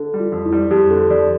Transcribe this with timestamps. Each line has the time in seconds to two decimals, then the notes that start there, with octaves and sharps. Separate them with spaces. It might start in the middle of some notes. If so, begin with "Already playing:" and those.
Already playing: D3 A4
0.14 G3
0.20 F4
0.32 F2
0.45 E4
0.52 G3
0.71 F2 G4
0.90 D3 A4
1.10 F2 D5